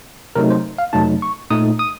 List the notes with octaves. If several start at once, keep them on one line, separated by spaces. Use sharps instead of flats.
C3 F#3 A3 D#4 A#4
C5
F5
F2 C3 F#3 A3 D#4 A5
C#6
A#2 A3 D#4 D#6
D#6